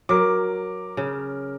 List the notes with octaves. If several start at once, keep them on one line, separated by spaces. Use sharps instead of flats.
F#3 A#4 D6
C#3